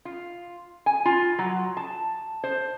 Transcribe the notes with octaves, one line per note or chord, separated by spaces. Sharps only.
F4
G#5
F4
F#3
A5
C5